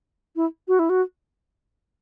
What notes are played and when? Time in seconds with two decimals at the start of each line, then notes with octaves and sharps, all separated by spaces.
0.36 E4
0.68 F#4
0.79 E4
0.89 F#4